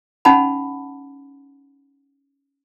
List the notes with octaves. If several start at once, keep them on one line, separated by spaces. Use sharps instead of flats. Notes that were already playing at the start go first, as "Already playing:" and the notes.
C#4 D#4 F#5 A5 B5